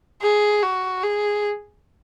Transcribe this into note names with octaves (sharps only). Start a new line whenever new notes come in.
G#4
F#4
G#4